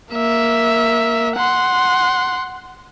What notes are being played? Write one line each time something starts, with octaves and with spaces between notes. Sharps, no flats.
A#3 E5
F#5 C6